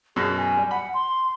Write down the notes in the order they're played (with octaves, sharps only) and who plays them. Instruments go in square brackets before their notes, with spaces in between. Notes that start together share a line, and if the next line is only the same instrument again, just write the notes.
[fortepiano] F#2 B2 [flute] G#4
[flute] G#5
[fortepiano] G3
[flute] F#5 [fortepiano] B5
[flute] C6